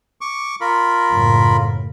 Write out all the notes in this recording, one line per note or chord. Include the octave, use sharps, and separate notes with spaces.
C#6 D6
F4 A#4 B5
F#1 F#2 A2